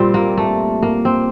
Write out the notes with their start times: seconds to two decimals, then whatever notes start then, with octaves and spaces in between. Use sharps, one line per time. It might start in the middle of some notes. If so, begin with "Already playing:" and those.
Already playing: A#2 G3 C4
0.14 A#3
0.38 A3
0.83 A#3
1.05 C4